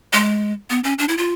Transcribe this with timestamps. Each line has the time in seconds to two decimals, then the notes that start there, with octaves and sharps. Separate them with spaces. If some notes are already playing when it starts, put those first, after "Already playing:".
0.13 G#3
0.70 B3
0.84 C#4
0.98 D4
1.08 E4
1.17 F4